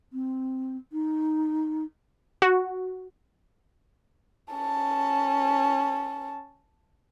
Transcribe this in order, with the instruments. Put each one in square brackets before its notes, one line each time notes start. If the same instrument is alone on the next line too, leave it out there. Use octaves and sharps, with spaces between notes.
[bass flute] C4
D#4
[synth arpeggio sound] F#4
[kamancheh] C#4 A5